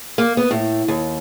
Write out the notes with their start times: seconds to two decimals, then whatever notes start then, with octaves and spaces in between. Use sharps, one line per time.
0.18 A#3
0.37 B3
0.51 A2
0.88 D#2